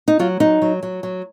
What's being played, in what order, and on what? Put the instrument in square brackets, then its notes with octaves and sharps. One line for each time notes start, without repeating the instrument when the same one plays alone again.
[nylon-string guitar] D#4
F#3 F4
F#3 D#4
F#3
F#3
F#3